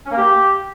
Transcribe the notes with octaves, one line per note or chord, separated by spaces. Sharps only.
C#4
A#3
G4